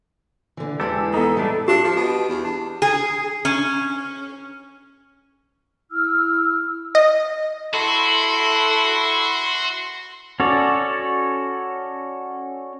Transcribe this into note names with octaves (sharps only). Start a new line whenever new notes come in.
D3 E3
E2 G#3 E4 G4 A4
B3 D#4 A4
A2 G3 A3 D4
D4 G4
F3
B2
E2
D4
G#4
C#4
E4 E6 F6
D#5
E4 F#4 A4 C6
C#4 F#4 A4 C#5 D5